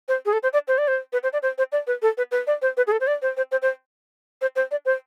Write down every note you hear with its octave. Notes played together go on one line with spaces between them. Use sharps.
C5
G#4
A4
C5
D5
C5
D5
C5
B4
C5
D5
C5
C5
D5
B4
A4
B4
B4
D5
C5
B4
G#4
A4
C5
D5
C5
C5
C5
C5
C5
C5
D5
C5